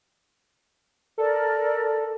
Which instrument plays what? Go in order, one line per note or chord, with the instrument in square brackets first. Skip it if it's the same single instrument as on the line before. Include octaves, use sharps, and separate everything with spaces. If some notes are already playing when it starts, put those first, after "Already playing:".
[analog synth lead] A4 [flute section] A#4 D5